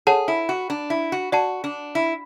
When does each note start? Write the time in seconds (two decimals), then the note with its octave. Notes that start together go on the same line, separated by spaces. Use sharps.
0.07 G#4 A4 C#5 F#5 A5
0.28 E4
0.49 F#4
0.70 D4
0.90 E4
1.12 F#4
1.32 F#4 D5 F#5 A5
1.64 D4
1.95 E4